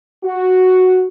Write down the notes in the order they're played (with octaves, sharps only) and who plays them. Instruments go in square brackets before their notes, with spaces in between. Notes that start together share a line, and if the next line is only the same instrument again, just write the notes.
[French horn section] F#4